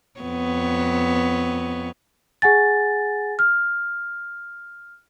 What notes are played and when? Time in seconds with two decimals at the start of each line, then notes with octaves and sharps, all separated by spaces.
0.20 F2 B3 C#5
2.42 G#4 F#5 G#5 A6
3.39 F6